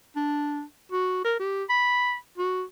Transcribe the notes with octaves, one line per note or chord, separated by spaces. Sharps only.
D4
F#4
A#4
G4
B5
F#4